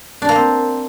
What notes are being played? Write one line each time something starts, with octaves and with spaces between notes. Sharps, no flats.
D4
A#3
C4